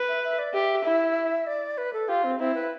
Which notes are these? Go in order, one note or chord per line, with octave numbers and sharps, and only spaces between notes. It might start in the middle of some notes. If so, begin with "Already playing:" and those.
Already playing: B4
E5
E5
D5
G4 E5
E4
D5
B4
A4
F4 G4
C4
C4 E4
B4